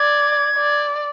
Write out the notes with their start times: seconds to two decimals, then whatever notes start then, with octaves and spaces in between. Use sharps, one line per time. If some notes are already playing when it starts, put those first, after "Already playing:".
Already playing: D5 G#6
0.57 D5